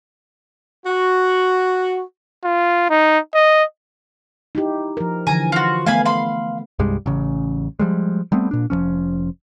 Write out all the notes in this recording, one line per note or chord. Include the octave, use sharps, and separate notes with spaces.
F#4
F4
D#4
D#5
D#4 E4 G4
F3 A#4
D3 E3 F3 G#5 A#5
F4 F#4
A3 B3 F5 G#5 B5
F5 B5 C6
C2 G2 G3 G#3
A1 C#3
F3 G3 G#3
G3 A3 B3 C4
A#2 D4
F1 E2 F3 C#4